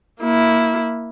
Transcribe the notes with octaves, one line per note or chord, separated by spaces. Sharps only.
A#3 E4